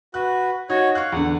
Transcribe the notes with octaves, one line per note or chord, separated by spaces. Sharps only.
F#4 B4 F#6
D#4 F#4 C#5
F5 C#6 F#6
E2 D3 F#5